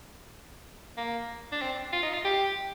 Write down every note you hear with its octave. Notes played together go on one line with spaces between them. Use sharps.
A#3
D4
C4
F4
D#4
F4
G4